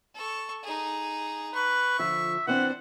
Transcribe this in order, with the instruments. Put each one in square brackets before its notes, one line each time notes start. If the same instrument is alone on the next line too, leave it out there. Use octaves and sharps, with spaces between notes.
[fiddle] A4 C#6
D#4 G#4
[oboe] B4 [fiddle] C#6
[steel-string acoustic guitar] D3 F3 [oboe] E5
[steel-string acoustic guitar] E3 C4 D4 [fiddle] C5 [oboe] F#5